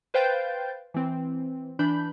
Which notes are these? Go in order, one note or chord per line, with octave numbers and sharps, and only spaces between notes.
B4 C5 F5 G5 G6 A6
E3 C4
E3 D4 B5 G6